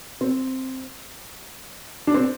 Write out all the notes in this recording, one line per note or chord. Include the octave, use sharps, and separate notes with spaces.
C4
D4
C4